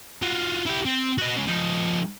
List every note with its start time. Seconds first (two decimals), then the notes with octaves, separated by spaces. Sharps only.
0.22 F4 F#4
0.66 E4 G4
0.85 C4
1.18 F#4 D#5
1.36 C#3 G#3
1.48 F3 D#4